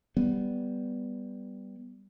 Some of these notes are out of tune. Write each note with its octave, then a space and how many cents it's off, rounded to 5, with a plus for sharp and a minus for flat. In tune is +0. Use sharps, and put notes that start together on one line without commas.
G3 +0 B3 +0